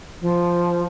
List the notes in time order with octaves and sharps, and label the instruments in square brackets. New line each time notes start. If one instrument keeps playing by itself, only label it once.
[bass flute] F3